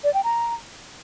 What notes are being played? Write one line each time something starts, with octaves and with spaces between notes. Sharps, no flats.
D5
G5
A#5